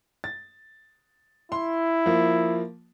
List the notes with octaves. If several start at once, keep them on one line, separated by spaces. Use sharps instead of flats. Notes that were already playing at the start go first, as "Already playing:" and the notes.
A6
E4 C6
F3 A#3